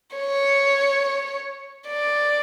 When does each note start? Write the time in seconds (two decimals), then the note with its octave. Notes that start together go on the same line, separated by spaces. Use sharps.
0.16 C#5
1.87 D5